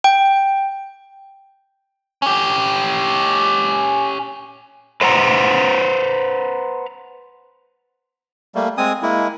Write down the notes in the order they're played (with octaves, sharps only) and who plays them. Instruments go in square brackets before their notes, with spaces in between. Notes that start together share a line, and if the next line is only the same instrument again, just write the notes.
[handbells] G5
[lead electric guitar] C#4 G4
[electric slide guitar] B4 C5 F#5 A#5
[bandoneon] G3 A3 A#3
G#3 C4 G#5 D#6
G#3 A#3 E4